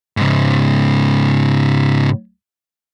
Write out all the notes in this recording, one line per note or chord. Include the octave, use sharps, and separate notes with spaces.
G#2 C#3